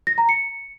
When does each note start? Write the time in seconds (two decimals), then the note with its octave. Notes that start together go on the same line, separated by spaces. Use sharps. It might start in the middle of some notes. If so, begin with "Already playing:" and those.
0.07 A#6
0.18 A#5
0.29 C#7